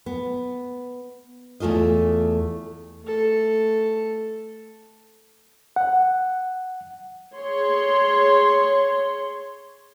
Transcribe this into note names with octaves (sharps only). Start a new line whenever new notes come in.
B3
E2 B2 A3 F4 D#5
A3 A4
F#5
G#4 C#5 C6